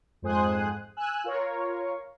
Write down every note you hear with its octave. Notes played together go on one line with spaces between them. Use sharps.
F2 G#2 C5 G#5 D#6 F#6
G#5 E6 F#6
F4 A#4 C#5